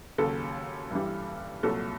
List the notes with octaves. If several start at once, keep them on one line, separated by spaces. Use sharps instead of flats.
D#2 C#3 F#3 A4
G2 E3 G3
C2 A#2 F#3 A4